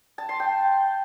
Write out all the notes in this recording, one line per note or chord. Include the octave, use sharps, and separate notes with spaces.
A5
C6
G5